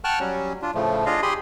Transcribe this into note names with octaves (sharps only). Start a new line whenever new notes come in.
F#5 G5 A5 C#6 F6 F#6
F#3 G3 C#4
D4 F4
A2 C#3 F3 A3
D4 F4 G#4 D#5 F5
G4 G#4 B5 C6 D#6